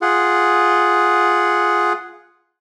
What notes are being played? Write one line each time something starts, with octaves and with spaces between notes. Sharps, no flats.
F4 G#4 F#5